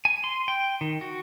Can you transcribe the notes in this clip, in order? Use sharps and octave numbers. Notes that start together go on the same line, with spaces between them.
G#5
C6
G5
D#3
F#4